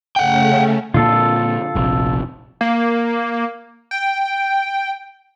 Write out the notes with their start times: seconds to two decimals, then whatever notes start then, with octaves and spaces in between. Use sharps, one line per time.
0.16 C#3 A3 C#4 F#5 G5
0.94 A#2 D3 A#3 F4 A4
1.75 F1 A#1
2.61 A#3
3.91 G5